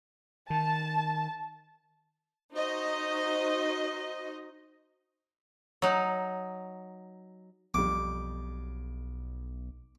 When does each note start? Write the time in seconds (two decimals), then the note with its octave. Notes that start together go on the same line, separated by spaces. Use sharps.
0.50 D#3 A5
2.53 D#4 F#4 C5 D#5
5.82 F#3 D#4
7.74 B1 F2 G3 D6